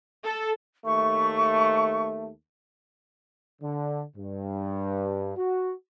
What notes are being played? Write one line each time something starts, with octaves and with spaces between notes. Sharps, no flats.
A4
D#2 A3 C#6
D3
G2
F#4